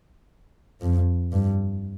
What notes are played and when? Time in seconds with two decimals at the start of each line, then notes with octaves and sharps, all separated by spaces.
0.82 F2
1.32 G2